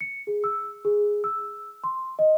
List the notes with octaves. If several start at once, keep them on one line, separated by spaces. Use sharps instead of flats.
C#7
G#4
E6
G#4
E6
C6
D#5